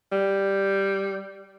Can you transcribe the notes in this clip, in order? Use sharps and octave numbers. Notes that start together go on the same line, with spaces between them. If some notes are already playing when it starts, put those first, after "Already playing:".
G3